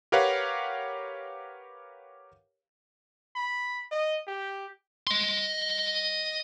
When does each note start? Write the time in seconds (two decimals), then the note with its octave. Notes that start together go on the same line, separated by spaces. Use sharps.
0.12 G4 A#4 B4 C#5 F5 F#5
3.36 B5
3.92 D#5
4.27 G4
5.07 D#5 C6